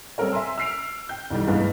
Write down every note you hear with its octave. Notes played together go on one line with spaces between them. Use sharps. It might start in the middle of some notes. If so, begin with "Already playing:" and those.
G3 C4 A4 A#4 C#5
E5 G#5 A#5 C6 E6
E6 F6 C7 D7 F7
G5 G6
B1 D#3 E3 G3
G2 E3 G#3 A#3 B3